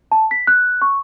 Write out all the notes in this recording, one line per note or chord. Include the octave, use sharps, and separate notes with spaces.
A5
B6
F#6
C#6